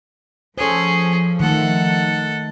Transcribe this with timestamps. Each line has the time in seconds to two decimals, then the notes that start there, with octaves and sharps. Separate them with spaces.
0.58 F3 C#4 G#4 A4 C5
1.40 D#3 A3 A4 F#5